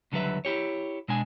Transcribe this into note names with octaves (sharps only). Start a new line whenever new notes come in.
C#2 D3 F#3 G3 B4 E5
E4 G4 C#5
B2 G#3 D4 G#5